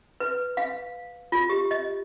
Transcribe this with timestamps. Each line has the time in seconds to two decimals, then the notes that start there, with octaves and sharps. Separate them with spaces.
0.20 B4
0.57 F5
1.32 F4
1.50 G4
1.71 D#5